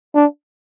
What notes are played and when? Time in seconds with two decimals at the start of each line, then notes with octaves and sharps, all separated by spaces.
0.15 D4